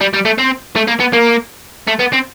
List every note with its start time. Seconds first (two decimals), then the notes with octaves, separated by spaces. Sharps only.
0.01 G3
0.14 G3
0.25 A3
0.38 C4
0.76 A3
0.87 A#3
1.00 B3
1.13 A#3
1.87 A3
1.99 B3
2.13 C4